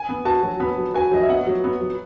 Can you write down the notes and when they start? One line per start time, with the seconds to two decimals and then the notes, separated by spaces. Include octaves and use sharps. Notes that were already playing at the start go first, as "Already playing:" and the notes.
Already playing: G#5
0.09 B3
0.25 F#4 A5
0.43 F#3
0.60 B3 B5
0.78 F#3
0.94 F#4 G#5
1.12 F#3 D#5
1.21 E5
1.29 B3 F#5
1.47 F#3
1.64 B3
1.81 F#3